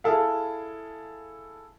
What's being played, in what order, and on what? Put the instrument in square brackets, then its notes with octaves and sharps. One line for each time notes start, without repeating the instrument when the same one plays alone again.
[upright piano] E4 G#4 A4 F5